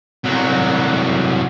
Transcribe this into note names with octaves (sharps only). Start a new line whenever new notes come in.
C2 F#3